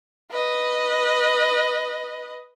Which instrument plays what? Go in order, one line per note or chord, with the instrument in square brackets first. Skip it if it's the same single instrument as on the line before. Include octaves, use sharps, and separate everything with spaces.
[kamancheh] B4 D#5